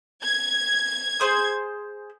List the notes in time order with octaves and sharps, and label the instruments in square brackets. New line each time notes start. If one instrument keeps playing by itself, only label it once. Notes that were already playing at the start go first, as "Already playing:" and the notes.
[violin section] G#6
[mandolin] G#4 C5 D#6